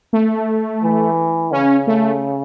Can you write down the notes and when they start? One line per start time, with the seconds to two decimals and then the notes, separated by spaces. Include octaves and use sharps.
0.13 A3
0.83 E3
1.52 C#3 C#4
1.87 A3